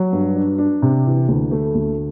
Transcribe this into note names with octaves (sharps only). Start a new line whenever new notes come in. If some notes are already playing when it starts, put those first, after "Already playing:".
Already playing: F#3
G2
D4
D4
C3
E3
D2
A3
D2